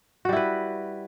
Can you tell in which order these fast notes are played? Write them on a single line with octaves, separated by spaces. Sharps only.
F#4 G3 E4 B4